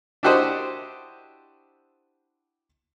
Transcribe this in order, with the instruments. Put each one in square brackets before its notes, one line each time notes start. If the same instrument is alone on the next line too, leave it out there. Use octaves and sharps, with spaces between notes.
[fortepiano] D4 E4 F#4 G4 C5 D#5